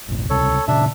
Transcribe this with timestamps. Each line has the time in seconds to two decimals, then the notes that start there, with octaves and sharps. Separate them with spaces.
0.08 F1 A#1
0.30 C#2 C3 A4 C#5
0.68 A#2 C#3 D4 E5